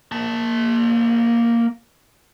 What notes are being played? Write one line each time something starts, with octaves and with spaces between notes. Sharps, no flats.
A#3 A5